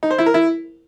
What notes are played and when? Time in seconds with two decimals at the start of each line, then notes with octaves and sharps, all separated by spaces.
0.03 D#4
0.11 C5
0.18 E4
0.26 A#4
0.34 E4